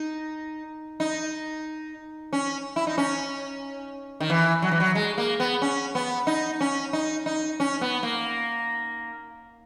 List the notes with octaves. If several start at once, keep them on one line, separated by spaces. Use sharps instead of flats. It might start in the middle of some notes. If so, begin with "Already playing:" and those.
Already playing: D#4
D#4
C#4
E4
D#4
C#4
D#3
E3
F#3
E3
F#3
G#3
A#3
B3
C#4
B3
D#4
C#4
D#4
D#4
C#4
B3
A#3